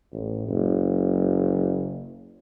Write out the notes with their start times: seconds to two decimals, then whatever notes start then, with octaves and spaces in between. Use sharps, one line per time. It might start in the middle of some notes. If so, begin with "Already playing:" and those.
0.13 A1
0.48 F#1